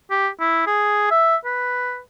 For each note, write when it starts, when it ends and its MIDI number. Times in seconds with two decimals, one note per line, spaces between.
0.10 0.28 67
0.40 0.66 64
0.67 1.10 68
1.11 1.36 76
1.45 1.99 71